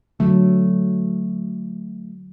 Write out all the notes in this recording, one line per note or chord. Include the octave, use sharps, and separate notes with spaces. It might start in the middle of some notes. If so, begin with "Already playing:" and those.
D3 F#3 A3